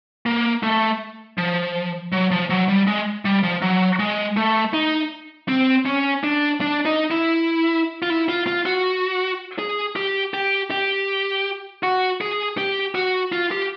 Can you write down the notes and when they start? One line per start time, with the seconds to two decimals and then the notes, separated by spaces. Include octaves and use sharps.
0.26 A#3
0.63 A3
1.38 F3
2.12 F#3
2.31 F3
2.50 F#3
2.68 G3
2.87 G#3
3.25 G3
3.43 F3
3.62 F#3
3.99 G#3
4.37 A3
4.73 D#4
5.48 C4
5.86 C#4
6.24 D4
6.61 D4
6.85 D#4
7.11 E4
8.02 F4
8.10 E4
8.29 F4
8.47 F4
8.66 F#4
9.59 G#4
9.96 G4
10.34 G4
10.71 G4
11.83 F#4
12.21 G#4
12.58 G4
12.95 F#4
13.32 F4
13.51 G4